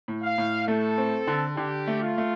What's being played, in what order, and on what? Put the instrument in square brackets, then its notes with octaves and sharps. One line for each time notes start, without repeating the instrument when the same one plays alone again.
[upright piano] A2
[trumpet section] F5
[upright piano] A2
[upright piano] A3 [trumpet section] A4
[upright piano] C4
D3
[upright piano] D3 [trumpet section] G4
[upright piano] A3
[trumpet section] F4
[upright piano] A3